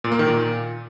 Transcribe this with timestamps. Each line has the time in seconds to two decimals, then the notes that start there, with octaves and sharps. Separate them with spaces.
0.04 A#2
0.12 A#3
0.19 D#3
0.27 A#2